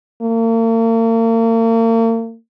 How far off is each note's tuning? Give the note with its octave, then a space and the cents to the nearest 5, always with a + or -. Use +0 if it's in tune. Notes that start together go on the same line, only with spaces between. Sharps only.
A#3 -40